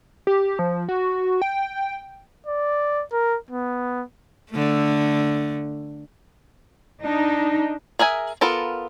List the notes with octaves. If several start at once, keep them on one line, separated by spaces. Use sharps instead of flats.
G4
F3
F#4
G5
D5
A#4
B3
D3 A3
D4 D#4
G#4 A#4 E5 G#5
B3 F4 A4 A#4